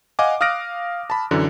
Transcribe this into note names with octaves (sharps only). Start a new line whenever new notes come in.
D#5 F5 F#5 G#5 D6
F5 D#6 F6 F#6 A#6 D7
A5 B5
F#2 D3 E3